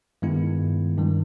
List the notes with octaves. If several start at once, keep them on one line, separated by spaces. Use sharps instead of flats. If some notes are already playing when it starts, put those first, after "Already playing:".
G2 D#3 G#3 B3 E4
G2 D#3 G3